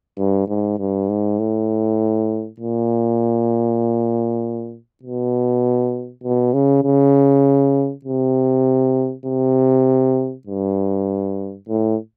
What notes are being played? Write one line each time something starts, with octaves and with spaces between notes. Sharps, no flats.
G2
G#2
G2
G#2
A2
A#2
B2
B2
C#3
C#3
C3
C3
G2
A2